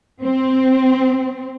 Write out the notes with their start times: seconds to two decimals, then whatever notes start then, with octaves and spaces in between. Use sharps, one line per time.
0.23 C4